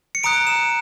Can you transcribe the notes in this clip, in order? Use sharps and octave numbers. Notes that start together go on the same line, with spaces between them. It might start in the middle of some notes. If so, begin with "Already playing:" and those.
C#7
A#5 D#6 F#6 D7
E7